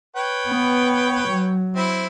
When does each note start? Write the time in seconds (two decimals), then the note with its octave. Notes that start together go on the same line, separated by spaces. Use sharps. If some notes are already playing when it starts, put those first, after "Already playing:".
0.16 B4 C#5 G5
0.47 B3
1.28 F#3
1.76 C4 E4